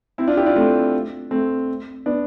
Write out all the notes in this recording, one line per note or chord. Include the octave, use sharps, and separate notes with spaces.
C4 E4
D4 F4
E4 G4
D4 F4
A3 C4
A3 C4
B3 D4